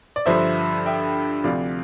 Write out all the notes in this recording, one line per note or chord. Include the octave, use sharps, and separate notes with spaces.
D5
G2 D3 F3 C5 E5
E5 G5
D2 C3 F3 D5 F5